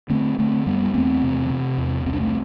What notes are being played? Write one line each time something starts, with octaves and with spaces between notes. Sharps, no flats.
D3 A3 C4
D3 A3 C4
F#2 G3 B3
B3
E2 A3 C4
C3
C3
E2
C2 C4
D4
A3 C4